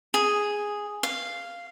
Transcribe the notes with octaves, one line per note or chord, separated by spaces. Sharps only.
G#4
F5